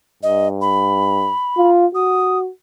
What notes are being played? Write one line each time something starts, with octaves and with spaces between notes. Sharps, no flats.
G2 D#5
B5
F4
F#4 D#6